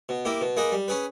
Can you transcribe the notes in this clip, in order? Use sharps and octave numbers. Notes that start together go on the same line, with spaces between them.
B2
A#3 E4 G4
B2
A#3 D#4 G#4 B4
G3
C#4 G#4 B4